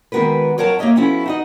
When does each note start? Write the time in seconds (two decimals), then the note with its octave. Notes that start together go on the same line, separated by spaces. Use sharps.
0.12 D#3 G#3 B3 F#4 A#4 B4
0.58 F2 F#3 A#4 C#5 F#5 A5
0.79 A#3 G4 C#5 D#5 E5
0.96 F3 B3 C#4 E4 F#4 A4
1.26 D#4 F#4 D#5